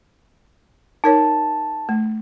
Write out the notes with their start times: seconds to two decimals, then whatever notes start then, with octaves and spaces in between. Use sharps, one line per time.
1.04 D#4 A#4 C#5 A5
1.89 A3